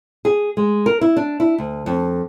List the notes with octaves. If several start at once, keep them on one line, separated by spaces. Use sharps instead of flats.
G#4
G#3
A#4
E4
D4
E4
D2
F2